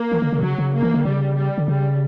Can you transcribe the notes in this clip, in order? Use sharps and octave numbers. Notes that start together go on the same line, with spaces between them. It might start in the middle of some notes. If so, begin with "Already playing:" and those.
Already playing: A#3
E3
D3
C#3
B2
C#3 F#3
C#3
A#3
E3
D3
C#3 G3
G3
D3
C#3 G3